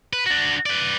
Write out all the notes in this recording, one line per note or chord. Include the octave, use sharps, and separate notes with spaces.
B4
D4 F#4
B4 D5